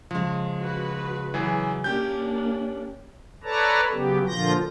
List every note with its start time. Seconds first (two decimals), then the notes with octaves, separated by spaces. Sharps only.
0.11 C#3 F3 G#3
0.58 F#4 B4
1.34 E3 F#3 G#4
1.84 A#3 C#4 D4 G4 G6
3.44 A4 B4 C#5 D5 A5 A#5
3.92 C#3 F#3 B3 G4
4.27 A#2 D3 F3 F4 G6 A#6